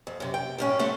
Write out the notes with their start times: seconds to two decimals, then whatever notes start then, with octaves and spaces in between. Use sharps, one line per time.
0.07 F2
0.20 F#2 C3
0.34 G5
0.58 F#2 A2 C#4
0.79 A3 C4 A4 F#5